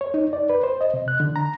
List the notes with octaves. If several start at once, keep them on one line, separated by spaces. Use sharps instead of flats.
C#5
D#4
D5
B4
C5
D#5
C3
F#6
D3
A#5